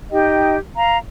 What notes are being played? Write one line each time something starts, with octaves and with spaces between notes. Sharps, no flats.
D#4 G4 D#5 G5
F5 A#5